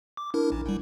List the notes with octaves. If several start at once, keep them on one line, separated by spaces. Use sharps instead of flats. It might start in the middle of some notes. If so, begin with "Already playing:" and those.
D6
D4 E4 A#4
A1
G1 G3